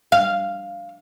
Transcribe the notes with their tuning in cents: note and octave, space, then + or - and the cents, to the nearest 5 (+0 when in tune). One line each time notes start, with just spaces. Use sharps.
F5 -5